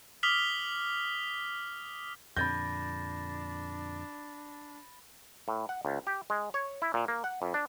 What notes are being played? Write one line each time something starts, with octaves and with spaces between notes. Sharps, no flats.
D6 D#6 F6 B6 F7 G7
F2 A#2 D3 D4 B5 G6 A6 A#6
A2
F#5
C#2
G4
G#3
C#5
E4
A#2
A#3
F#5
F2
D4